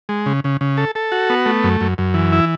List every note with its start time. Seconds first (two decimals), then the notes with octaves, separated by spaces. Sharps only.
0.09 G#3
0.26 C#3
0.44 C#3
0.61 C#3
0.77 A4
0.95 A4
1.12 F#4
1.30 B3
1.46 A3
1.64 F#2
1.81 F#2
1.98 F#2
2.14 E3
2.32 E4